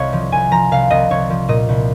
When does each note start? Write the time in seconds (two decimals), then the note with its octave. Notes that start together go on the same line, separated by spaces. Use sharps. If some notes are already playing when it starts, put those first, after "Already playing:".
Already playing: C2 C#5 D#5 F5
0.13 F3
0.32 C2 G#5
0.51 F3 A#5
0.71 C2 F5
0.90 C2 D#5
1.10 C2 C#5
1.30 F3
1.48 A#2 D#5
1.69 C2